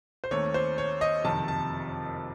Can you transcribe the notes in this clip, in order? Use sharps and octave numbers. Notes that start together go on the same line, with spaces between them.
C5
D#2 D#3 A3 C4 C#5
C5
C#5
D#5
F#1 F2 C3 D#3 A5
A5